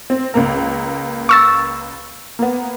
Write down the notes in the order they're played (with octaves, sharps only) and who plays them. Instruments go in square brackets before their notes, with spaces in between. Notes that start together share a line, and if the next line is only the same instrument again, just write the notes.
[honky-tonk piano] C4
C#2 A#3 A#4
[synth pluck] C#6 E6 A6
[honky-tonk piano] A#3 B3